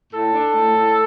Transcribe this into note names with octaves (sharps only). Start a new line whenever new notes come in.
A2 A4
D4
A2
A2